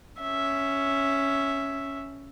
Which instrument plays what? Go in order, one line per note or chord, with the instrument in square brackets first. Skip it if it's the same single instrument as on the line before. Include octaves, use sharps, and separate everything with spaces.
[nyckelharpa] C#4 E5